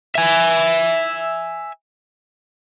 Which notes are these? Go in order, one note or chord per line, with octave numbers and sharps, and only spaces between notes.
E5 G#5